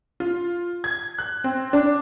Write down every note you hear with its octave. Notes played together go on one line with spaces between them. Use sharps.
F4
G#6
F#6
C4
D4